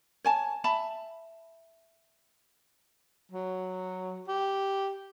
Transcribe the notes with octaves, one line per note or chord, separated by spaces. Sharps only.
C#5 G#5 A5
E5 A5 B5
F#3
G4